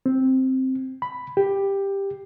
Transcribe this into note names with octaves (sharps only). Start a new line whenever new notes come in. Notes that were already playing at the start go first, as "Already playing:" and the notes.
C4
B5
G4